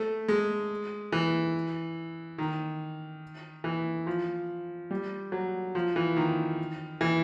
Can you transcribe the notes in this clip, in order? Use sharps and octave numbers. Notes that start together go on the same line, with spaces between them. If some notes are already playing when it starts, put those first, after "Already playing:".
Already playing: A3
G#3
E3
D#3
E3
F3
G3
F#3
F3
E3
D#3
E3